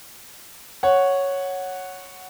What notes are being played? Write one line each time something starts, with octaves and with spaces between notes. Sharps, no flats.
C#5 F#5